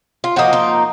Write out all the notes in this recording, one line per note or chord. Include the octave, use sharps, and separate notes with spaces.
F4
F3 A#3 D#4 F#4
F4